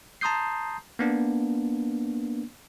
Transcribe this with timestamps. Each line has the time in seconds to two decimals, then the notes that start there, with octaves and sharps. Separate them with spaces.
0.21 A5 A#5 C6 D#6 G6 C7
0.99 A#3 B3 D4